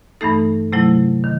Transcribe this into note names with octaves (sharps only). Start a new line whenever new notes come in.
G2 E3 A3 D#4 A4
C3 F#3 A3 E4
D#3